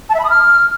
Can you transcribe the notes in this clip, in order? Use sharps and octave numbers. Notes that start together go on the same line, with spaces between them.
A5
E5
B5
D#6
F6